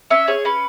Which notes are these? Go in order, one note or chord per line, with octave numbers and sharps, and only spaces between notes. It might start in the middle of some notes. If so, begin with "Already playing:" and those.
C#4 E5
G#4 C#5
C#4 B4